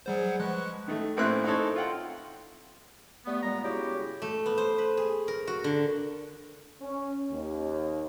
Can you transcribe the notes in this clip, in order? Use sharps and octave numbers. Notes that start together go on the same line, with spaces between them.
F#3 G3 G#4 C5 F#5 D#6
F3 G#3 B4 C#6 F#6
D#3 A3
A2 A#3 C4 C#4 E4 F#6
C4 D#4 E4 A4 C#5
F4 F#5 G5
G3 A3 B3
A#2 G3 G#3 B3 A#5
C#3 E4 F#4 G4
A3
B3
C5
B4
G#4
A#4
F#4
D3
C#4
D#2